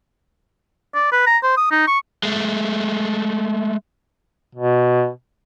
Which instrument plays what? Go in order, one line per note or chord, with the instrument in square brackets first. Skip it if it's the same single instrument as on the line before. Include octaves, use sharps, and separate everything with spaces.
[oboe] D5
B4
A#5
C5
D#6
D#4
C#6
[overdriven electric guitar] G#3 A3
[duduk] B2